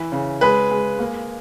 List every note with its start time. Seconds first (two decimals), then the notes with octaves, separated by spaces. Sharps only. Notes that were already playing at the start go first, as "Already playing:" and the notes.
Already playing: E3 E4
0.12 C#3
0.41 G#3 B4
0.71 G#3
0.99 A#3